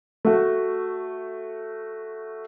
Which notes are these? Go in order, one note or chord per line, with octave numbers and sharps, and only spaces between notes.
A3 F#4